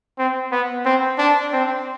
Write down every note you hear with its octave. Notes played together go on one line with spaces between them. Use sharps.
C4
B3
C4
D4
C4